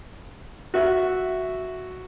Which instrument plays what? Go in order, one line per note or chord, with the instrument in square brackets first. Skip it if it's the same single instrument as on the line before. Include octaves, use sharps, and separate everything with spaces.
[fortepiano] F#4 E5